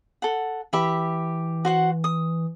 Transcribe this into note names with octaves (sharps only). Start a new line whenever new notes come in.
A4 F#5
E3 G4 E5 B5
F#4 C5 F#5
D#6